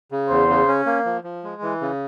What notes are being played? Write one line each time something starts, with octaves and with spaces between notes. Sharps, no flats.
C#3
E2 C5
C#3
C#4
A#3
F3
F3
G#3
E3
C#3